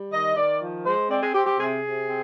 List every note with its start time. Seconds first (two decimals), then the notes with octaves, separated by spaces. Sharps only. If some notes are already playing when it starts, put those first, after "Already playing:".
Already playing: G3
0.11 D#3 D#5
0.36 D#3 D5
0.61 F3
0.85 G#3 C5
1.09 C4 D5
1.22 G#4
1.34 C4 G4
1.46 G4
1.59 C3 G#4
1.83 C3
2.08 C4